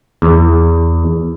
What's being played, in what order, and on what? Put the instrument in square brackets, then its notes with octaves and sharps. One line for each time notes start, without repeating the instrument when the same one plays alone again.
[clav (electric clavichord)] E2